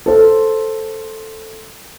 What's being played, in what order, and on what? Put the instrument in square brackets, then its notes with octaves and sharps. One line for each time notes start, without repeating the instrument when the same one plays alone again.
[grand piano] A4 C5